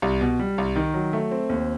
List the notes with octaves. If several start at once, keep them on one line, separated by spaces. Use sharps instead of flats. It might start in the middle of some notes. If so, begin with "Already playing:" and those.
C2
B2
G3
C2
D#3
F#3
A3
C4
D#2